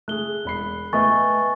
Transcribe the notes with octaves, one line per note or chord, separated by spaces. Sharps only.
A3 G#4 F#6 G7
E1 B5 C7
A3 B3 D#5 G#5 C#6 A6